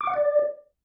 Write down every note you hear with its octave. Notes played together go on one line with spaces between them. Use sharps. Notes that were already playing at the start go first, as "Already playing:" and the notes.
D6
F#5
D5